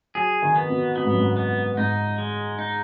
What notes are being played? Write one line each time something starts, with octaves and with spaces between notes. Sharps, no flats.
F#3 G#4
D#3
B3
B2
B2 B3
G#2
F#2
G#2
B3
G#2 D#4
G#3
D#4